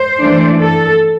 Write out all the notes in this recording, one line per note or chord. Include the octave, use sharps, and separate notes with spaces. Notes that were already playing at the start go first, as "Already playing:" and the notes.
Already playing: C5
E3 A3 D4
A4